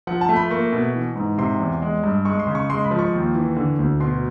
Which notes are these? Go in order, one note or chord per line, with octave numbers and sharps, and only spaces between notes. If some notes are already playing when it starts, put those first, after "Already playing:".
F3 F#5
A5
A3
B5
A#3 C#6
B2
E3
G#2
C3 C6
E2
G#3
G2
G#3 C#6
C6
C#3
C#6
G#3 C6
B5
F3
C#6
D#2
E3
D3
D2
B2 C6